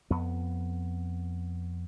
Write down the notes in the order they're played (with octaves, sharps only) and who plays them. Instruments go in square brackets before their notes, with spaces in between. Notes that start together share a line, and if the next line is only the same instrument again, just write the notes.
[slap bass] F2 B3